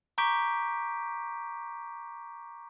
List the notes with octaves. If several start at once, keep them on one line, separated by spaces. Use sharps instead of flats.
A#5 C#6 D6 G6 B6 D7